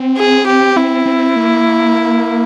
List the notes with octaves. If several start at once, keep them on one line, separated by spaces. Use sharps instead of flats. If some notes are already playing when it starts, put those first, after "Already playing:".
Already playing: C4
G#4
G4
C4 E4
C4
A#3